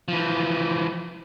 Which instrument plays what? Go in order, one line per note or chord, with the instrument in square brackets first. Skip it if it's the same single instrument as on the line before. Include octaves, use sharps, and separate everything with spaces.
[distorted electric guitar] E3 F3